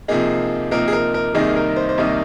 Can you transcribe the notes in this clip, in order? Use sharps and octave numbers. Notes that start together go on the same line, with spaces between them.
C3 F3 A#3 D#4 G#4
C3 F3 A#3 D#4 A#4
G#4
A#4
A#4
C2 C3 D#3 A#3 D#4 G#4
A#4
C5
C5
C2 C3 D#3 A#3 D#4 D#5